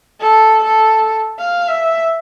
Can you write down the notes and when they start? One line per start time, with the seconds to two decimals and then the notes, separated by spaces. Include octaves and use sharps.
0.21 A4
0.65 A4
1.39 F5
1.69 E5